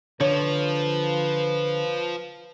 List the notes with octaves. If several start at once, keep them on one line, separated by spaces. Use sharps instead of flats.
D3 F3 B4 C#5